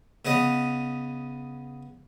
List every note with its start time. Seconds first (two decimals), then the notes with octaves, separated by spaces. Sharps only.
0.25 C#3 B3 C#4 B4 D#5 D#6